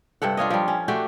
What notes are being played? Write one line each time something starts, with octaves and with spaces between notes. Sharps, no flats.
G2 C3 A4 F#5
D4 F4 C#5 D#5
F3 G3
C#4
A3 D4 F#4 G4